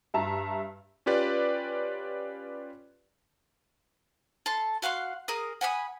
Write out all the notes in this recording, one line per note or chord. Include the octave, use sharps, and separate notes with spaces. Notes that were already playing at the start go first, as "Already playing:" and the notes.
G2 E5 A5 A#5
C#4 F4 G4 B4 D5
A4 A5 C6
F#4 F5 F#5 C6
G#4 A#4 D#6
F#5 G#5 B5 D#6